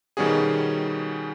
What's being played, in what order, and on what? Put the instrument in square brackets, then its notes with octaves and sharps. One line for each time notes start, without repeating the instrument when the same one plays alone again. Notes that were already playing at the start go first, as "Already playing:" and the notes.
[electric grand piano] B2 D#3 G3 C#4 F#4 G#4